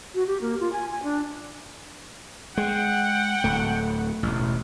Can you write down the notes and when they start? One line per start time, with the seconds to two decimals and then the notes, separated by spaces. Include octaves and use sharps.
0.15 F#4
0.27 G4
0.41 A#3
0.60 F4
0.73 G#5
0.92 G#5
1.03 D4
2.57 G#3 F#5 G5
3.44 D1 A3
4.23 E1 A1